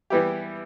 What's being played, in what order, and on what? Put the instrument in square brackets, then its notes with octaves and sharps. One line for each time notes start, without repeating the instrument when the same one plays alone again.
[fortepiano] E3 G3 B3 E4 G4